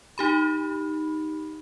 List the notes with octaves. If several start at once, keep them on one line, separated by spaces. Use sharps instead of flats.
D#4 G4 B5